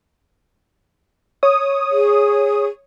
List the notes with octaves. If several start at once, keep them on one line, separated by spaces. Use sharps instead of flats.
C#5 D#6
G#4